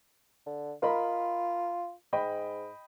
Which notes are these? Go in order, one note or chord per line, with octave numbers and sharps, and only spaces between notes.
D3
F4 A#4 D#5 B5
G#2 D#5 G5 B5